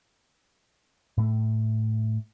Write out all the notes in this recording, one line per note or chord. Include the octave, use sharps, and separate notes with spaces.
A2 A3